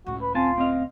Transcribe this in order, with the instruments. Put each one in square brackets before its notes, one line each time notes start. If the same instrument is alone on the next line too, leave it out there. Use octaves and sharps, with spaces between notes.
[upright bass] C#2 A2 [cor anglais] F#4
[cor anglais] B4
[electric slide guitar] C4 G#5 A5 [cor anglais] F4
[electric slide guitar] C4 D#5 F5